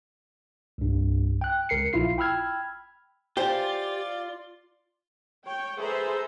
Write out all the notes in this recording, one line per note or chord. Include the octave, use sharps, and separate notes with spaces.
C2 G2
G5 F#6
C#2 A#4 C7 C#7
A#1 E4 F4 C7
G5 B5 E6 F6 G#6
E3 F4 G4 C5 D5
C#5 G5
G#4 A4 B4 C5 E5 A#5